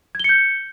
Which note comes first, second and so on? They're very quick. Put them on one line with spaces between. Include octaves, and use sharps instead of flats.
G#6 G7 C#7 G6